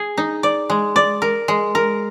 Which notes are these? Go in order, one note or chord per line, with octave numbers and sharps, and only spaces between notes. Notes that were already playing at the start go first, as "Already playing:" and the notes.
Already playing: G#4
D#4
D5
G#3
D5
A#4
G#3
A#4